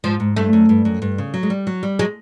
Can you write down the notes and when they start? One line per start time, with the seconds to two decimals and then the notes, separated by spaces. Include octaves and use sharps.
0.04 G#2 F3
0.20 G#2
0.36 G2 A3
0.53 F#2
0.69 G2
0.85 F#2
1.02 G2
1.18 C#3
1.34 F#3
1.43 G#3
1.50 G3
1.67 F#3
1.83 G3
1.99 F#3 G#3